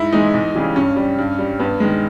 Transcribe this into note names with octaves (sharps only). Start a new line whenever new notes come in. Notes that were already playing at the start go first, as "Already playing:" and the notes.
Already playing: G#2 E4
E3 G#3 D#4
E2
C#3 E3 G3
G2 C#4
G3
G2
G3
G2 B3
D#3 G#3